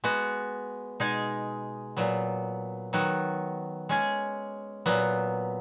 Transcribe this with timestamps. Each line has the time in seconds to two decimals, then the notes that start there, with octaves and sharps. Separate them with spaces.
0.04 G#3 B3 F#4
1.00 B2 G#3 D#4 G#4
1.97 A#2 F#3 B3
2.93 D#3 F#3 B3 F#4
3.89 G#3 C#4 G#4
4.86 A#2 F#3 B3